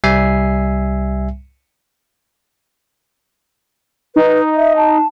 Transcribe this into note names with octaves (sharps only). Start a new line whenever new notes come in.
C2 G3 E5 G#5 C7
D#4 B4
E5
A5